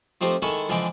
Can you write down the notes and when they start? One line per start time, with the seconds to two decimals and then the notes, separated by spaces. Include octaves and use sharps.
0.21 F3 A3 C4 D#4 G4 C5
0.42 D#3 G#3 E4 A4 C#6
0.69 F2 D3 E3 G#3 G5